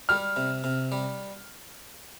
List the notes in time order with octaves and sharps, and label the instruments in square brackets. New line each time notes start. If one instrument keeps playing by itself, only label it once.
[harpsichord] G3 [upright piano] F6
[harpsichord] C3
C3
G3